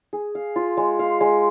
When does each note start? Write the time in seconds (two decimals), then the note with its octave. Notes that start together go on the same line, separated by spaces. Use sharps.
0.13 G#4
0.35 F5
0.56 F4
0.77 G#3
0.99 F5
1.21 G#3